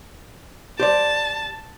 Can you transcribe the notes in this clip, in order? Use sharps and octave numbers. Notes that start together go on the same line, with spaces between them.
G4 C5 D5 A5